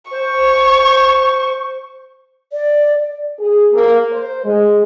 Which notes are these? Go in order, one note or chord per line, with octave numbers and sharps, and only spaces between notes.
C5 C#6
D5
G#4
A#3
C5
G#3